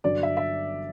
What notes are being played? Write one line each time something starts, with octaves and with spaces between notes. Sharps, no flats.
G1 G2 F#3 D5
E5
E5